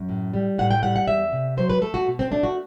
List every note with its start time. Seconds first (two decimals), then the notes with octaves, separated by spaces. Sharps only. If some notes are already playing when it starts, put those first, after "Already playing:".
Already playing: F#2
0.09 A2
0.34 G3
0.58 A2 F#5
0.71 G5
0.83 G3 F#5
0.96 F#5
1.08 E2 E5
1.32 C3
1.57 F#3 C5
1.70 B4
1.81 A3 A4
1.94 F#4
2.07 B2
2.19 C4
2.31 A3 D4
2.43 F#4